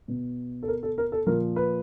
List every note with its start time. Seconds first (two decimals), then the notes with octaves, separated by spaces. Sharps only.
0.08 B2
0.63 A4
0.68 A#4
0.83 A4
0.98 A#4
1.12 A4
1.27 A#2 F3 A#4
1.56 B4